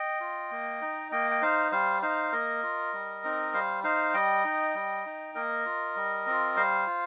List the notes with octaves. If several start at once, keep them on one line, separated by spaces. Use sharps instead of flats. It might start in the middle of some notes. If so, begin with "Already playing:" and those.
Already playing: D#5 G5
F4
A#3
D#4
A#3 D#5 G5
G5
D#4 C5 F5
G3 C5 F5
D#4 C5 F5
A#3 A#4 D#5
F4
G3
C4 D#4
G3 C5 F5
D#4 C5 F5
G3 D#5 G5
D#4
G3
D#4
A#3 A#4 D#5
F4
G3
C4 F4
G3 C5 F5
F4